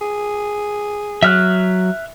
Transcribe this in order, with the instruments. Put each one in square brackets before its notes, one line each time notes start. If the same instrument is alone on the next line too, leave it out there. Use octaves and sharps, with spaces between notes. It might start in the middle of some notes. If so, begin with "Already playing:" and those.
[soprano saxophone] G#4
[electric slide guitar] F#3 [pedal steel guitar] E5 F6 F#6